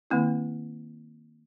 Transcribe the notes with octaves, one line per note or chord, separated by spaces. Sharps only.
D#3 A#3 C4 E4